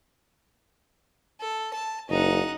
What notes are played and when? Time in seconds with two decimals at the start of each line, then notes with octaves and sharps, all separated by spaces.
1.40 A4
1.73 A5
2.09 F#1 D#4 F#5